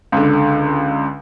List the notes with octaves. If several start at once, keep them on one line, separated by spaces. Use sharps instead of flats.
C#2 D3